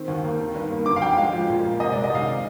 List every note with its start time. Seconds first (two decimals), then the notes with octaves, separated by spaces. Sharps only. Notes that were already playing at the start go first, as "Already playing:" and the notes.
Already playing: D#3 C4
0.08 D#2
0.24 A#3
0.40 D#3
0.55 G2
0.71 A#3
0.86 D3 D6
0.96 F5
1.02 F2 G5
1.17 G#3 F5
1.33 F3
1.50 A#2
1.65 A#3
1.80 C3 D#5
1.93 D5
1.95 G#3
2.04 D#5
2.11 D#3 F5
2.28 C3